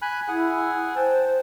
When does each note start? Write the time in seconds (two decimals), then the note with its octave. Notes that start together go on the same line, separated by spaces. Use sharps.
0.02 G#5 B5 F#6
0.28 E4 G#4 F#5 G#5
0.96 C5 G5 A5